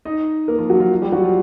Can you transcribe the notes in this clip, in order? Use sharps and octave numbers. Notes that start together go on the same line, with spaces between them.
D#4 D#5
A#3 A#4
F3 F4
F#3 F#4
F3 F4
G3 G4
F#3 F#4
F3 F4